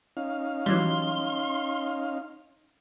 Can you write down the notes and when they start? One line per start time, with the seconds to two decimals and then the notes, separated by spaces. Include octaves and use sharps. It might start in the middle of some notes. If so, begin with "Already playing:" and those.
0.17 C#4 D#4 F5
0.66 E3 F#3 G3 C6